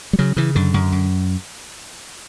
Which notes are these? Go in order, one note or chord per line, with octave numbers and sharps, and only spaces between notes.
G3
C#3 F#3
C#3 E3
F#2 D3
F#2
F#2